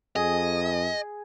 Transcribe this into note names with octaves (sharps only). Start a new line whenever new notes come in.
F2 G#4 D#5